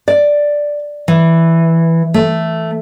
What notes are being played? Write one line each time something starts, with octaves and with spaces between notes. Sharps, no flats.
D5
E3
A3